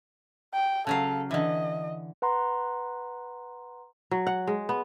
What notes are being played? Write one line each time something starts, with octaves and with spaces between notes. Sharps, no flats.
G5
C#3 F#3 A4 F5
D3 E3 D#5
B4 F#5 A#5 C6
F#3
F#5
G#3
B3